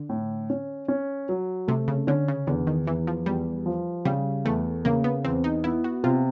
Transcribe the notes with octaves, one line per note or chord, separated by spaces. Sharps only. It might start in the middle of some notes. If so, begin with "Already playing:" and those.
Already playing: D3
A2
C#4
C#4
F#3
C3 A3
C#3
D3 C#4
C#3
E2 D3
D#3
E2 E3
F3
E2 G3
F3
C#3 G3
E2 A3
C#3 A#3
B3
E2 C4
D#4
B3 E4
F#4
C3 F4